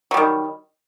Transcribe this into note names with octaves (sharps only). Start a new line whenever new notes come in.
D#3 F#3 G3